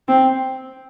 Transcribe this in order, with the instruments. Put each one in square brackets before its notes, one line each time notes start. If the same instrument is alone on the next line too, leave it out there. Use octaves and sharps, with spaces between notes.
[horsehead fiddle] C4